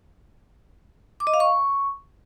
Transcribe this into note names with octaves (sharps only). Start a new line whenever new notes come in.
D6
D#5
F5
C#6